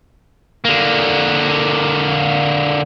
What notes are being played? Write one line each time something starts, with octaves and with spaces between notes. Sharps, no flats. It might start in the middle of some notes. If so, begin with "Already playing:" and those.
D3 A#3